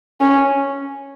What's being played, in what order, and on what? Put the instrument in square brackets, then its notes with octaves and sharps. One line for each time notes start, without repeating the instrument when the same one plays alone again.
[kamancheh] C#4